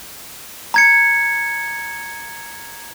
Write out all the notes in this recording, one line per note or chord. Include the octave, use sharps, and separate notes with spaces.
A#5 G#6 C#7